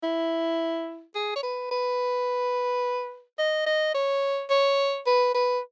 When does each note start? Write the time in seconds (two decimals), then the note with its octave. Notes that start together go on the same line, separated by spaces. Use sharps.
0.03 E4
1.15 G#4
1.36 C#5
1.43 B4
1.71 B4
3.39 D#5
3.66 D#5
3.94 C#5
4.50 C#5
5.06 B4
5.34 B4